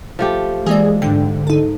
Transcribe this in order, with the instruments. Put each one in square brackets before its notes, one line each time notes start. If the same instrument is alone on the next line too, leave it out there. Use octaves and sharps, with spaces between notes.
[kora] F3 A3 G4
[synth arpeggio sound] E3 A#3 D5 [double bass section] G#3 [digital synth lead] G#4
[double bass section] G#2 [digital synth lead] D3 [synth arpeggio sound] G5
[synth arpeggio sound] D#4 A4